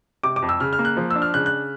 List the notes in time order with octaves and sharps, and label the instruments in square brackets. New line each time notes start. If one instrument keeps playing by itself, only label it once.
[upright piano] C3 D6
D6
F2
E6
C#3 F6
F6
A#3
F#6
F3
D4 E6
F6
C#3 F#6
F#6